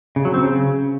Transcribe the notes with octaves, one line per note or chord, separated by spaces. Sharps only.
C#3
F#3
C4
C#3